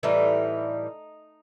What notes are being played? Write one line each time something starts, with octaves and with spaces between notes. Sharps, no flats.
A2 E3 G3 D#4